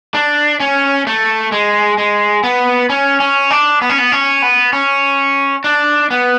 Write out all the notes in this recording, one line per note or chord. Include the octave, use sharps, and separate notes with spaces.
D4
C#4
A3
G#3
G#3
B3
C#4
C#4
D4
B3
C#4
B3
C#4
B3
C#4
D4
B3